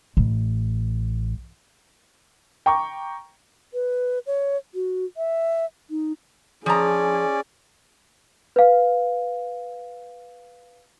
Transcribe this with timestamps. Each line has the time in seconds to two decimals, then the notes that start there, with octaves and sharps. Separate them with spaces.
0.17 A1
2.66 G5 A#5 C#6 D6
3.74 B4
4.27 C#5
4.74 F#4
5.17 E5
5.90 D#4
6.66 F3 C#4 G#4 D5 A#5
8.56 B4 F5